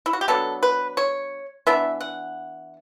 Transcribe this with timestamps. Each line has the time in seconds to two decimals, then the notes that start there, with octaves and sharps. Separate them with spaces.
0.06 E4
0.13 F#4
0.21 G4
0.28 F#3 B3 D4 A4
0.63 B4
0.97 C#5
1.67 E3 B3 D4 E5
2.01 F#5